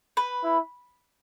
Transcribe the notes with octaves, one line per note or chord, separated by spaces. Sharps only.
B4
E4